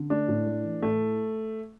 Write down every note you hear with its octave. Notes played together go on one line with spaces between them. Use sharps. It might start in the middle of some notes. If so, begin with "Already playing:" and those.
Already playing: D3
A3 D4
A2
A3
E3
A2 A3